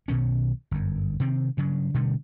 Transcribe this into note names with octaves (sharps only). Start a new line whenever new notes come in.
B1 B2 D#3 C#4
G1 F#2
C3 D#3 C4
G2 C#3 F#3
B2 D3 G3 A3